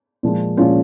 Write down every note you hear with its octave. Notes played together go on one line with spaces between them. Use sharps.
A#2 F3 G#3
A#2 F3 G#3 C#4 F4